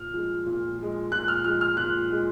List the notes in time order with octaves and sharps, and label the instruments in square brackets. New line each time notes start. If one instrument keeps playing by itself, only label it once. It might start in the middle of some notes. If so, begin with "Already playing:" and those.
Already playing: [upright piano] A#2 [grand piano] F6
[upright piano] F3 G#3
A#2
F3 G#3
[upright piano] A#2 [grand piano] F#6
[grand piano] F6
[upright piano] F3 G#3 [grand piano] F6
[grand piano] F6
[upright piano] A#2 [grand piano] F#6
[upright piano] F3 G#3